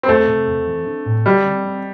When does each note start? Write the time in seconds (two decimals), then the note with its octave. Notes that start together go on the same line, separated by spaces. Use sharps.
0.03 C4
0.09 E2 A3
0.28 C3
0.47 E2
0.67 E3
0.87 D4
1.06 A2
1.26 D3 G3
1.45 C4
1.65 C4